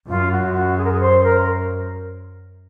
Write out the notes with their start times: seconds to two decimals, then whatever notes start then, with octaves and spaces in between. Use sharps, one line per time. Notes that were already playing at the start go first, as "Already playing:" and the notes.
0.08 F#2 F4
0.32 F#4
0.54 F#4
0.78 G#4
0.85 A#4
0.92 G#4
1.01 C5
1.24 A#4